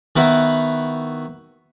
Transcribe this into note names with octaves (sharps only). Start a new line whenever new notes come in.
D#3 B3 E4 F#4